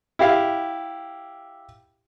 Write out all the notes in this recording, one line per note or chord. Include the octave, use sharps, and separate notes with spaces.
E4 G4 F5